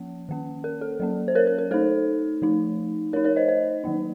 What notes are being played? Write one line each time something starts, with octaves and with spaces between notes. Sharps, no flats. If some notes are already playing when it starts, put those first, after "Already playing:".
Already playing: F3 A#3 C#4
D#3 A#3 C#4
A#4
A4
F#3 A#3 C#4
C5
A#4 C#5
A#4
A#4
A3 D#4 A4 C5
F3 A3 D#4
A3 D#4 A#4 C#5
A#4 C#5
C5 D#5
C5 D#5
D#3 F#3 A#3 D#4